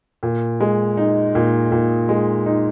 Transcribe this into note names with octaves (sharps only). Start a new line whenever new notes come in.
A#2
G#3
D#4
A#2
A#2
G#3
D#4